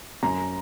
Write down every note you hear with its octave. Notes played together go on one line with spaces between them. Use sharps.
F#2 A#5